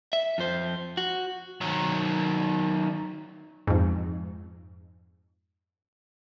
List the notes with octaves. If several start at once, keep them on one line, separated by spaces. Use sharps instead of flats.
E5
F2 C5
F#4
D#3 F#3
F2 G#2